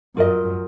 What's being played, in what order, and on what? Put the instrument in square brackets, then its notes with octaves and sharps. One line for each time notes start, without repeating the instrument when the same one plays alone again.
[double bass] F#2 [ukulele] F4 A#4 D#5